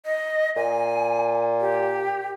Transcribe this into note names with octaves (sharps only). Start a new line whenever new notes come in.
D#5
A#2 G#5
G4